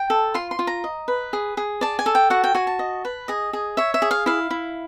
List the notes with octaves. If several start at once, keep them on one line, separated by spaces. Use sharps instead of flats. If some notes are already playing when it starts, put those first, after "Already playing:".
Already playing: G5
A4
F4 C6
C6
F4
A#5
D#5
B4
G#4
G#4
D5 A5
G#5
A4
G5
F#4 F#5
G5
F#4 G#5
A5
D#5
B4
G#4 D#5
G#4
C#5 E5
E5
G#4
F5
E4 F5
E4